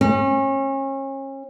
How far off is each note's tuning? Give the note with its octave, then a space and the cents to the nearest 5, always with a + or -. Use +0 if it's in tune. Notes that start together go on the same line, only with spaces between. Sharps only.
C#4 -35